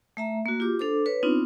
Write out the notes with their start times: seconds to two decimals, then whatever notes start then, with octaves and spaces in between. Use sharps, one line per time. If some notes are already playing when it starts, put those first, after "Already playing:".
0.17 A3 E5 A#5
0.46 A#3 F#4
0.60 F4 G4 D6
0.79 D4 A4 C5 D6
1.06 B4 C#5
1.23 B3 C4 D4 D#4 F4